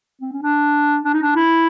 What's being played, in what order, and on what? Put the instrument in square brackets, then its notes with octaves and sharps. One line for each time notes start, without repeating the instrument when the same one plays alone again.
[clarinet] C4
C#4
D4
D4
D#4
D4
E4